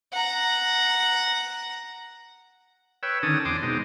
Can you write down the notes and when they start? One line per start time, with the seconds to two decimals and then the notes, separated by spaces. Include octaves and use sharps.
0.13 F#5 A#5
3.03 B4 C#5 G5 E6
3.23 D3 D#3 C#4 A5 D#6
3.45 E2 C4 D4 C6 D6 D#6
3.63 B2 G#3 C4 D#4